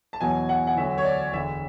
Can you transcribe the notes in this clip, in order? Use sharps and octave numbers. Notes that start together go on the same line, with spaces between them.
A5
E2 B2 F#3 G#5
F#5
F#5
D2 D3 F#3 E5
C#5
D5
E1 D2 D3 E5